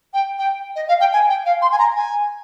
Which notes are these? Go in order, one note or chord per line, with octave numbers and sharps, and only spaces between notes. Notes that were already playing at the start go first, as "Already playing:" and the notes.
G5
G5
D#5
F5
G5
G#5
G5
F5
C6
G#5
A#5
G#5